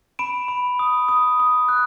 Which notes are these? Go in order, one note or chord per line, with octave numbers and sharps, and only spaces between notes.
B5 D7 E7
B5
D#6
D#6
D#6
F#6